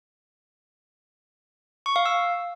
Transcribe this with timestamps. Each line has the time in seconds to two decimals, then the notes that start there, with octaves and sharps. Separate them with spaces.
1.86 C#6
1.96 F5
2.06 E6